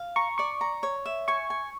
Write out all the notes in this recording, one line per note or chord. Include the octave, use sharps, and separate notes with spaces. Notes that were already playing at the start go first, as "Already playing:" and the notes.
Already playing: F5
A#5 C#6
D5 C#6
A#5
C#5
E5
G#5 C#6
G#5